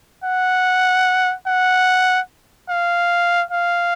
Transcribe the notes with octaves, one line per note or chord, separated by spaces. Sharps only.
F#5
F#5
F5
F5